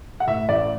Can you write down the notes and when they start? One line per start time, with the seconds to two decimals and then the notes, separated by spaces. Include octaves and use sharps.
0.20 F#5
0.27 A2 E5
0.48 A1 D5